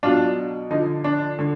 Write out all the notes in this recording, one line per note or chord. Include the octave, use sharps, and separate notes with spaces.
B2 F#3 D4 F4
D3 F3 D#4
D4
D3